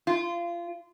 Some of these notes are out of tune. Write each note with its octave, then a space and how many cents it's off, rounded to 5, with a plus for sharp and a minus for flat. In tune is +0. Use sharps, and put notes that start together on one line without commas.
F4 -25